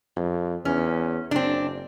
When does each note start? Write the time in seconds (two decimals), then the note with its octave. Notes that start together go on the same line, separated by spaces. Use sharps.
0.16 F2
0.65 E2 C#4
1.31 F#1 C4 D4